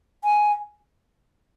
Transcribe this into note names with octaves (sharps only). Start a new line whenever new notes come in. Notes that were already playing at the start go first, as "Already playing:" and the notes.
G#5